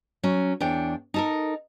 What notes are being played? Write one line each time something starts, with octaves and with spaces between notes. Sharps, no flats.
F#3 C#4
E2 D4 C#5 G5
D#4 A4 A#4